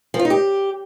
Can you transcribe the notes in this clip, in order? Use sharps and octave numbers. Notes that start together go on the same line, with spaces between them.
F3
F4
D#4
G4